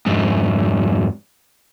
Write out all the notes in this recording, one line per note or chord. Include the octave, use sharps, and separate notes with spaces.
F2 G#2